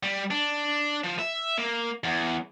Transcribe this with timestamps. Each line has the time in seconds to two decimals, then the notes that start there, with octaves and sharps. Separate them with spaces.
0.03 G3
0.31 D4
1.04 F3
1.19 E5
1.58 A#3
2.04 E2